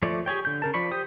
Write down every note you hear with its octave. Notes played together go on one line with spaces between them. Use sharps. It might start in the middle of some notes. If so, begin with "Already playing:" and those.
F3 A3 C#5 D5
G4 G#4 C#5 G5
D3 G6
C#3 A#4 A5
F3 D5 B5 C#6
G4 C5 D#6